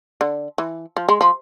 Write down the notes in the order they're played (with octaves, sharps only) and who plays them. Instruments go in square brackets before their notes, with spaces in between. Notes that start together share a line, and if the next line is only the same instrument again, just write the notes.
[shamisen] D3
E3
F3
G#3
F3